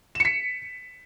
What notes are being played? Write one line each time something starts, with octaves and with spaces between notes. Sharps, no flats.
B6 C#7 E7